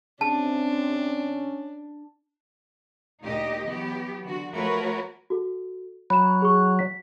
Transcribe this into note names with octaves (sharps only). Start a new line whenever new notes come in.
C3 C#4 D4 A5
D2 A#2 D#4 G4 D#5
E3 F#3 B3 G4
D3 F#4
F3 A3 F#4 A#4 B4 C#5
F#4 A4
F#3 B5 E7
G#4 C#6
B6